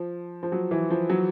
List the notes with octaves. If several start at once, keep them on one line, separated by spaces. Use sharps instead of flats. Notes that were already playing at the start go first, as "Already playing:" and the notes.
Already playing: F3
F3
F#3
E3
F3
F#3